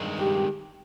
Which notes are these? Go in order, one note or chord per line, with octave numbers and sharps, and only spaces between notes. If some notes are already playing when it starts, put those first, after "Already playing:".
Already playing: G2 D#3 G#3
G4